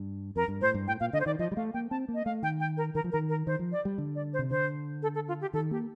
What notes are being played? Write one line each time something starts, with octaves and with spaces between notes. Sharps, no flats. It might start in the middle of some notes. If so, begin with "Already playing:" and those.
Already playing: G2
F2 A#4
G2
A2 C5
G2
A2 G5
A#2 F5
D3 D#5
C5
D#3 D5
F3 D#5
G3
A3 F5
A#3 G5
C4 A5
A#3
D#5
A3 F5
D#3 G5
G5
A#4
D#3 A#4
F3
D#3 A#4
A#4
D#3 C5
F3
D5
G3
D3
D5
C5
C3
D3 C5
A4
A4
F4
G4
D#3 A4
A#3 G4